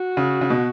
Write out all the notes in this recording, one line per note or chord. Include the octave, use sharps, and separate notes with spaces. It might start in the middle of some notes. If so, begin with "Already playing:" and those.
Already playing: F#4
C#3
C#3
B2